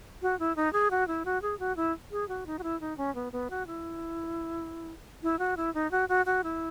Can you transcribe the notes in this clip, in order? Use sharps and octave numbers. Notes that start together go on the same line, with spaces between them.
F#4
E4
D#4
G#4
F#4
E4
F#4
G#4
F#4
E4
G#4
F#4
D#4
F#4
E4
D#4
C#4
B3
B3
F#4
E4
E4
F#4
E4
D#4
F#4
F#4
F#4
E4